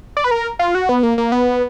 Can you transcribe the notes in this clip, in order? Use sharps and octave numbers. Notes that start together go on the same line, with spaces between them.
D5
B4
A#4
F4
F#4
B3
A#3
A#3
B3